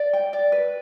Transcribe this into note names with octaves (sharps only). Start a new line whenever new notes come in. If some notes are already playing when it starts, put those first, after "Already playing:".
Already playing: D5
G5
D5
B4